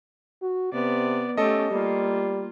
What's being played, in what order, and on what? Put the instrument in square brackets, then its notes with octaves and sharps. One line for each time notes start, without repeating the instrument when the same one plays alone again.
[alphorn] F#4
[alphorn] C3 [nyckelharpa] B3 D5
[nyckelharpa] A3 G4 [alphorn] C#4 [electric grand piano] A4 D#5
[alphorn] G3 [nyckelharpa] A#3 F4